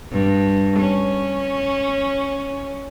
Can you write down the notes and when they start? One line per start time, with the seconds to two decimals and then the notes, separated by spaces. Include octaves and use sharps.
0.12 G2
0.79 C#4